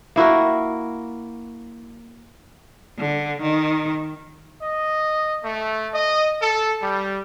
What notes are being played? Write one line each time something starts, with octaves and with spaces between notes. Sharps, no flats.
A#3 E4 F#4 A#4
D3
D#3
D#5
A3
D#5
A4
G3